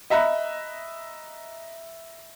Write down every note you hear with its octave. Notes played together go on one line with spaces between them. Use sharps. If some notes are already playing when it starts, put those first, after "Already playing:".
D#5 E5 A#5 B5 F#6